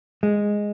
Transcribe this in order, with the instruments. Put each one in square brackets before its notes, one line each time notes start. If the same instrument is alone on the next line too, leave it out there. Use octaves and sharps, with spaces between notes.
[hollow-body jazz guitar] G#3